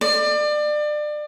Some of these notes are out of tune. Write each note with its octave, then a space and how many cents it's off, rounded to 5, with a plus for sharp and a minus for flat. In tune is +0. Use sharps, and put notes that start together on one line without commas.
D5 +30